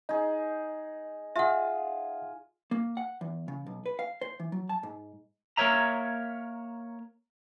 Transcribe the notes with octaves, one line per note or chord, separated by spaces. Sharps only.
D#4 G#4 D#5
F4 G#4 E5 F#5
A#3
F#5
E2
C#3
B1
B4
F5
C5
E3
F#3
A5
G#2
A#3 A#4 B4 C#5 E5 A#5